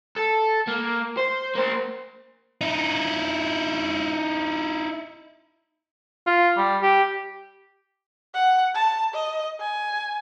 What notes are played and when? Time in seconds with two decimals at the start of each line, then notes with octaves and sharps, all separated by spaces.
0.16 A4
0.68 A#3
1.18 C5
1.55 A#3 C5
2.61 D#4 E4
6.27 F4
6.57 G3
6.82 G4
8.35 F#5
8.75 A5
9.14 D#5
9.61 G#5